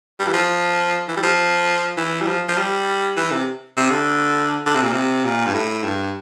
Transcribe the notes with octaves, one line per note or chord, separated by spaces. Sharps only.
G3
E3
F3
E3
G3
F3
E3
G3
F3
F3
G3
E3
C3
C3
D3
D3
C3
A#2
C3
A#2
G2
A2
G2